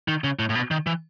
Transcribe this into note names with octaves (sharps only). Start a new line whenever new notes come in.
D#3
C#3
A2
A2
B2
D#3
E3